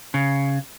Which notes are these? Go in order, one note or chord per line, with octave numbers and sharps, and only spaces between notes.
C#3